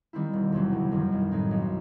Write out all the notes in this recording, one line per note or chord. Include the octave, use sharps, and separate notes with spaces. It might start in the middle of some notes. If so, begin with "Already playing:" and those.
D#3 G3 C4 E4
E1
E2 C3 F#3 C4
G1
F#2 D#3 G3
B1
A2 F#3 C4 D#4
B1